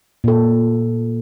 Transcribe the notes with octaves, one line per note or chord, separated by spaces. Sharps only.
A#2 A4